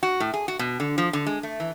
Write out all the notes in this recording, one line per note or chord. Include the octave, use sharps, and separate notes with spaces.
F#4
A2
G#4
F#4
B2
D3
F3
D3
G#3
A3
E3